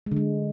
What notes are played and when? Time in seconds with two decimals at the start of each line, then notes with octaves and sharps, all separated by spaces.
0.06 G#3
0.11 D3
0.17 G#3